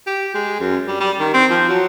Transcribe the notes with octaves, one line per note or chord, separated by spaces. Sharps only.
G4
G#3
F#2
G3
G3
D#3
C4
F3
F#3